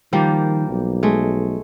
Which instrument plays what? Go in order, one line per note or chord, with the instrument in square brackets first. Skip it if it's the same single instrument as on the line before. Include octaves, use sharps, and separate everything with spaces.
[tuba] D#3 [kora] F3 G3 A#3
[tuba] B1
[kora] G#3 A3